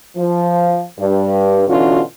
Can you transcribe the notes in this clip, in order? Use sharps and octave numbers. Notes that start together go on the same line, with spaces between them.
F3
G2
B2 D3 E3 C#4 F4 F#4